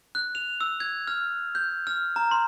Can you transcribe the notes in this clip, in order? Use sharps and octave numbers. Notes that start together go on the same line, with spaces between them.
F#6
F7
E6
G#6
F6
G6
F6
A#5
C6